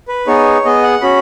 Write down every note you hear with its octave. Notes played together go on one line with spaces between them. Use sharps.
B4
B3 D#4 G#4 C#5
B3 G#4 D#5
F#5
C#4 F#4 B5